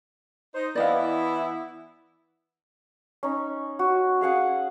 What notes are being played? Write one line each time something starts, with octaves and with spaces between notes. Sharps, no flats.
D#4 C5
E3 B3 E4 D5 D#5 F5
C#4 D#4
F#4
G#4 F5 F#5 G#5